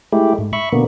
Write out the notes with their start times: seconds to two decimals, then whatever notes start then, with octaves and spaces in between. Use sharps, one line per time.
0.12 G#3 A3 E4 G4
0.38 G#2
0.53 E5 B5 C#6
0.73 B2 D3 A#3 B3